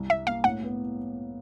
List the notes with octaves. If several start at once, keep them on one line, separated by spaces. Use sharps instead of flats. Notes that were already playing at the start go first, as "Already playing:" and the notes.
Already playing: C2
G3 E5
A#3 F5
A2 F#5
B3